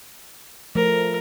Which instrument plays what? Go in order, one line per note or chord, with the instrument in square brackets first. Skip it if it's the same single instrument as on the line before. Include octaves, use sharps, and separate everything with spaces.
[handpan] F3 A3 [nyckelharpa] A#4